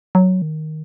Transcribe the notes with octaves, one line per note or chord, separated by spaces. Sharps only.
F#3
D#3